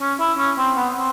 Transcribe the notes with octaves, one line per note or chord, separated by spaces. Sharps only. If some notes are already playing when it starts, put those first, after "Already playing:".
C#4
E4
C#4
C4
B3
C4